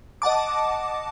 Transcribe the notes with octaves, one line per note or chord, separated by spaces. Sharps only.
D#5 F#5 A5 D6